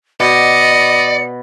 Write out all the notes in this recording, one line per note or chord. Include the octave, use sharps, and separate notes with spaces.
B2 D5 D#5 C#7